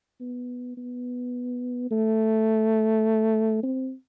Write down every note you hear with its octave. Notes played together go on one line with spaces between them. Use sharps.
B3
B3
A3
C4